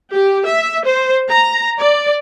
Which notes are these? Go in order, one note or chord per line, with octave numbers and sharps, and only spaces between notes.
G4
E5
C5
A#5
D5